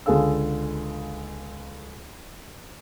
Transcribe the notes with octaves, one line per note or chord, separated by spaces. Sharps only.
C#2 D3 G#4 A4 F5 E6